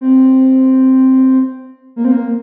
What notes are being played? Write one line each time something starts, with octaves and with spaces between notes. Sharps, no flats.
C4
A#3
C4
A#3